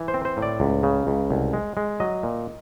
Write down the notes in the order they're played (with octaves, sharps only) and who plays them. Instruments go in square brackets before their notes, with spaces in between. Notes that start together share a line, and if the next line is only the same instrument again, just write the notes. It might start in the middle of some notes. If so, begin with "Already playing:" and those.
Already playing: [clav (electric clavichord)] E3
C5
C4
C5
A2
D5
C#2
C#3
C#2
C2
G#3
G#3
F#3 D#5
A#2